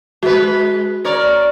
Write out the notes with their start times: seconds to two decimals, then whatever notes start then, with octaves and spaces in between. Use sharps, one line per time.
0.23 G#3 F#4 B4
1.04 A#4 C#5 D5